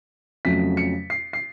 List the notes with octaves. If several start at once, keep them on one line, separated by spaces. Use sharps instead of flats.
F2 C#3 F#3 A3 B6
C#7
C7
C7